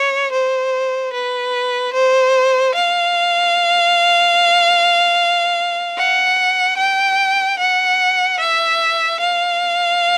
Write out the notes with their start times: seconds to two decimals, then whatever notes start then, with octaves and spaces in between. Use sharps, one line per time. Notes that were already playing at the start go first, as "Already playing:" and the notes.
Already playing: C#5
0.32 C5
1.13 B4
1.94 C5
2.75 F5
5.98 F#5
6.77 G5
7.59 F#5
8.39 E5
9.20 F5